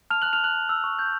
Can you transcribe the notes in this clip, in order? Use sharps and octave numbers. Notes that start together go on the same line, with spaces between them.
A5 F6 F7
A5 F#6 F#7
F6 F7
A5 F#6 F#7
A5
E6
C#6
G6